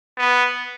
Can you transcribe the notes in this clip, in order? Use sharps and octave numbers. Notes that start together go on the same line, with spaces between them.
B3